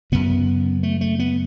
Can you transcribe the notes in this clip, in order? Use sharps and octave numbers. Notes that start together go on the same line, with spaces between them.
F#2 C#3 B3
A3
A3
B3